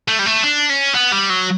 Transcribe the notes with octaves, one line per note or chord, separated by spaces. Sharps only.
A3
G3
A3
D4
C#4
B3
G3
F#3